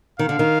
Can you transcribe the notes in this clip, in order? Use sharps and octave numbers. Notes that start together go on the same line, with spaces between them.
D#3 F5
D3
D#3